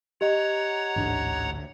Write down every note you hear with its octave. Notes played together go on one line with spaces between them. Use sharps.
G4 C#5 D#5 F#5 A#5
A1 D2 G#2 D4